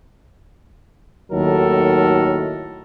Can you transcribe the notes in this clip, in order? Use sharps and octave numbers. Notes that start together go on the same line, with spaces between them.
D#2 A2 D#3 F#3 A4 A#4